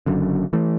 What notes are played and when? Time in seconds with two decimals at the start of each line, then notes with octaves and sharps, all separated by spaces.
0.06 F#1 F#2 D3
0.53 E3 A3